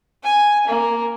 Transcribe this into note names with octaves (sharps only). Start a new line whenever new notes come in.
G#5
A#3